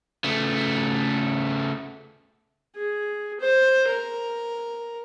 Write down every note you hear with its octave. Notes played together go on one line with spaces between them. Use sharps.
C#3 A3
G#4
C5
A#4